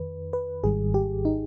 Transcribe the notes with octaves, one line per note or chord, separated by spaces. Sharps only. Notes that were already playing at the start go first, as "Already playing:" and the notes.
Already playing: F2 D#3 B4
B4
G#1 G#2 D#3 G3 G#4
G4
D#4